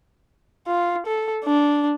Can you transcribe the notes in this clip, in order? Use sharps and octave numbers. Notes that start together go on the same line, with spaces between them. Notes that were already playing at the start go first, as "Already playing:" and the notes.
F4
A4
D4